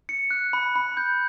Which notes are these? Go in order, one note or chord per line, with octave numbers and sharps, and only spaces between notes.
C#7
F#6
B5
B5
G6